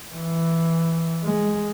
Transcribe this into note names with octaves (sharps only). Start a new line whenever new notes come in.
E3
G#3